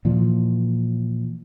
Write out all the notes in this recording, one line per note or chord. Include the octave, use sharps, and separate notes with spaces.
A#2 E3 F3